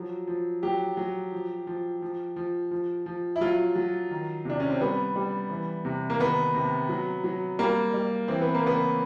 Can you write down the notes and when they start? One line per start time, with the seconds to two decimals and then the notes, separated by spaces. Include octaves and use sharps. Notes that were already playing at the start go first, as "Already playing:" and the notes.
Already playing: F3 F#3
0.27 F3
0.63 F#3 G4
0.97 F#3
1.32 F3
1.67 F3
2.02 F3
2.36 F3
2.71 F3
3.06 F3
3.36 E4
3.41 F#3 F4
3.76 F#3
4.11 D#3
4.45 C3 D4
4.60 C#4
4.70 C4
4.81 G3 B3
5.16 G3
5.49 E3
5.85 C3
6.10 A#3
6.19 D#3 B3
6.55 C3
6.89 F#3
7.24 F#3
7.59 G3 A#3
7.94 G3
8.28 E3 C4
8.41 B3
8.54 A#3
8.64 C#3 B3